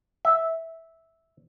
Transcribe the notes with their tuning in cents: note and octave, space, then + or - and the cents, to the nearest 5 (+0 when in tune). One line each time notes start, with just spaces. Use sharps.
E5 -10